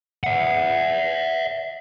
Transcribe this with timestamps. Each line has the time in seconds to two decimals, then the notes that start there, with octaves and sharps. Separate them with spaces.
0.24 E5 F#5